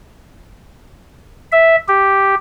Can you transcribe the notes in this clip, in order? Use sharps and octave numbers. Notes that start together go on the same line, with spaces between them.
E5
G4